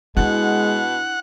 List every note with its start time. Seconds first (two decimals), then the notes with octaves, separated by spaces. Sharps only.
0.17 B2 G#3 D4 E4 F#5